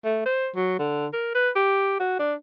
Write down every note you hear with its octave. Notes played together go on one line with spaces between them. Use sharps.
A3
C5
F#3
D3
A#4
B4
G4
F#4
D4